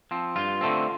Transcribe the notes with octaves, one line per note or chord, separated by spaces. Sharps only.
F3 C4
G2 F4
D3 A3 C4